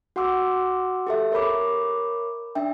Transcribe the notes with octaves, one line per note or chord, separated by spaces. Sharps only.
F#4 F#5 C6 D6 E6
G4 A4 E5
A#4 C#5 B5 D6
D4 E5 G5